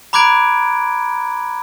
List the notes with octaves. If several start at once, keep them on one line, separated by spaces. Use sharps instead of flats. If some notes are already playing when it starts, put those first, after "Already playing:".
A#5 B5 D6 F#6 G#6 D7